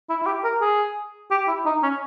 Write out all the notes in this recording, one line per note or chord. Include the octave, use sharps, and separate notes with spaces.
E4
E4
G4
A#4
G#4
G4
E4
D#4
C#4